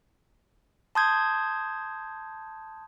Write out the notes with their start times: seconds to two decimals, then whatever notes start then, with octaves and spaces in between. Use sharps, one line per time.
0.95 A5 C6 D#6 G6 G#6